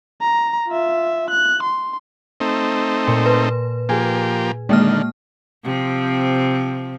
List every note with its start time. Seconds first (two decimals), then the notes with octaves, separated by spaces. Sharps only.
0.21 A#5
0.68 F4 E5
1.30 F#6
1.63 C6
2.40 A3 C4 D#4
3.07 A#2 C6 C#7
3.26 B4
3.89 F3 A#3 G4 G#4
4.69 D3 D#3 G#3 A#3 F6
5.64 C3 F3 C4